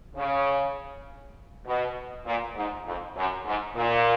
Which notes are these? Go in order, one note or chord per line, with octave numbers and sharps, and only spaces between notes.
C#3
B2
A#2
G#2
F2
F#2
G#2
A#2